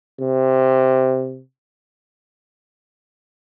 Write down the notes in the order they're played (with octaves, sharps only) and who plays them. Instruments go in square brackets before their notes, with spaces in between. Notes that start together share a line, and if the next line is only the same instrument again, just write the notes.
[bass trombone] C3